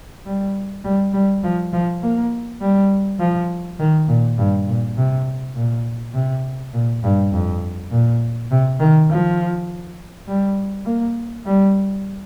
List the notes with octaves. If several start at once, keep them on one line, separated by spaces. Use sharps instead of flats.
G3
G3
G3
F3
F3
A#3
G3
F3
D#3
A#2
G2
A#2
C3
A#2
C3
A#2
G2
F2
A#2
C3
D#3
F3
G3
A#3
G3